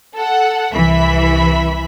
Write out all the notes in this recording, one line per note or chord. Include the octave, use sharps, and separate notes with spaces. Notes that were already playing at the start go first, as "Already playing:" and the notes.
A4 F#5
C2 E3 E5 B5 B6